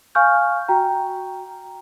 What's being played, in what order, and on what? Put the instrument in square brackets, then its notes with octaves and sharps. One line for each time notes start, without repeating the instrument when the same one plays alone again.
[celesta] F5 G#5 C#6 F6 G6
F#4 G5 A#5